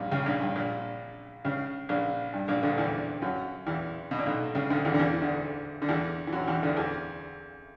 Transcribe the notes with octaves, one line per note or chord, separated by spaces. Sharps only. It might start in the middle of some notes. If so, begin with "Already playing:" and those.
Already playing: A#1 G2 A#2
C#2 C#3
A#1 A#2
G2
A#1 A#2
C#2 C#3
A#1 A#2
G2
A#1 A#2
D2 D3
E2 E3
F#2 F#3
E2 E3
B2
A#2
B1 B2
C#2 C#3
D2 D3
E2 E3
D3
E2 E3
E3
D2 D3
D3
E2 E3
E3
F#2 F#3
E2 E3
D2 D3
E2 E3